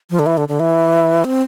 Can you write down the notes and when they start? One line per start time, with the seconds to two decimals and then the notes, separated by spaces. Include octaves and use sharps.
0.10 F3
0.19 D3
0.26 E3
0.37 D3
0.48 D3
0.60 E3
1.24 C4